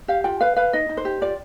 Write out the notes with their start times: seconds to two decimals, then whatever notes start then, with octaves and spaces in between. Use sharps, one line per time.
0.08 G4 F5
0.24 F4 G5
0.40 B4 F5
0.56 B4 F5
0.73 D#4 D#5
0.89 D#4
0.97 C5
1.05 G4
1.21 F4 D5